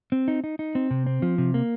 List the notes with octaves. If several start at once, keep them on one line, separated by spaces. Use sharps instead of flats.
C4
D#4
D#4
D#4
C4
C3
C4
F3
C3
A#3